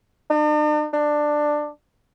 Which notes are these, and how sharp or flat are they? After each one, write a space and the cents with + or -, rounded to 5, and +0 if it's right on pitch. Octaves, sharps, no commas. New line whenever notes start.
D4 +45
D4 +15